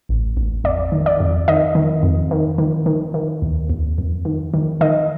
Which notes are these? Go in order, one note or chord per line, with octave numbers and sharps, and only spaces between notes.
A1
A1
F2 D5
D#3
D5
F2
D#3 D#5
D#3
F2
D#3
D#3
D#3
D#3
D#2
D#2
F2
D#3
D#3
D#3 D#5